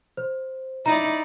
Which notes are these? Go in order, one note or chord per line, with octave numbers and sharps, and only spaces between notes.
C5
D#4 E4 D5 A#5